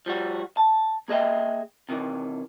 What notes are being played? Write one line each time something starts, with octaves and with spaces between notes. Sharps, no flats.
F3 G3 F#4
A5
A#3 G#4 D#5 E5 G5
C3 D#3 E3